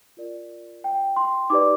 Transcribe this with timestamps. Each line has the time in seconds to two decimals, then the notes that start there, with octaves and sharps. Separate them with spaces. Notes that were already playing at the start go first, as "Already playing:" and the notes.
0.17 F4 A#4 D5
0.84 G5
1.16 C6
1.50 D#4 G4 B4 D5 D6